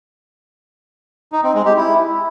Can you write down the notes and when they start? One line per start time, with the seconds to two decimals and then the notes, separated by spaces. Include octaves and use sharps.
1.32 D#4
1.43 C4
1.54 G#3
1.65 G4
1.77 E4